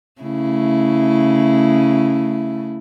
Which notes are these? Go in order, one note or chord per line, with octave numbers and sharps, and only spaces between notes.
C#3 A3 E4